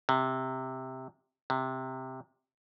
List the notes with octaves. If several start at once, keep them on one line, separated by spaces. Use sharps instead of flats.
C3
C3